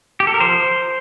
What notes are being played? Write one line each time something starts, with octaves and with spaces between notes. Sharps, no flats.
G4
A4
A#4
F3 C5